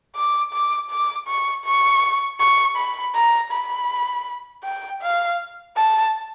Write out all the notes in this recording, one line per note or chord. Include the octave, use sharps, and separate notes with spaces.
D6
D6
D6
C#6
C#6
C#6
B5
A#5
B5
G5
F5
A5